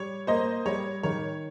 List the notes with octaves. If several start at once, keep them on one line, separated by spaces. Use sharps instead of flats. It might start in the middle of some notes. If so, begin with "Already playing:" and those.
Already playing: G3 C#5
A#3 C5 D#5
G3 C#5
D#3 C#5